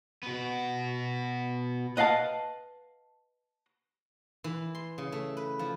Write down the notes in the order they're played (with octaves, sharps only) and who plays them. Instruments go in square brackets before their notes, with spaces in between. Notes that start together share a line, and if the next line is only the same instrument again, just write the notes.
[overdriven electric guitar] B2 B3
[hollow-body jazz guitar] B4 D#5 F5 F#5 A5
[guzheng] E3
C6
C#3
A3
B4
F3